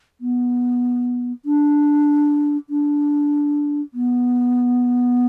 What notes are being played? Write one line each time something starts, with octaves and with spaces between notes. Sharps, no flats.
B3
D4
D4
B3